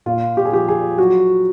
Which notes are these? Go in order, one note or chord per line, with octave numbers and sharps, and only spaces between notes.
A#2 F4
G4
G#4
F3 G4
G#4
F#3 F#4